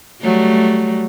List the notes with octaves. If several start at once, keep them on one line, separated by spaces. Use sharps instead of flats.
F#3 G3 A3